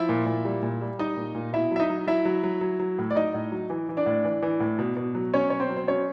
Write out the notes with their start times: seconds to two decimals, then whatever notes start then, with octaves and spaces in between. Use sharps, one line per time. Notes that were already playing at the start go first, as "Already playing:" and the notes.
Already playing: F3 E4 E5
0.09 A#2
0.26 A#2
0.45 G3
0.63 A#2
0.81 G3
0.99 G3 D#4 D#5
1.17 A#2
1.35 A#2
1.53 B2 E4 E5
1.71 F#3 E5
1.80 D#4 D#5
1.90 F#3
2.07 F#3 E4 E5
2.25 F#3
2.43 F#3
2.61 F#3
2.80 F#3
2.99 A2
3.10 D5
3.15 F#3 D#4 D#5
3.34 A2
3.52 F#3
3.70 E3
3.89 E3
3.97 D4 D5
4.06 A2
4.25 E3
4.42 E3
4.60 A2
4.79 B2
4.96 B2
5.15 F#3
5.34 F#3 C#4 C#5
5.50 B2 C#5
5.60 C4 C5
5.69 F#3
5.76 C5
5.87 F#3 C#4 C#5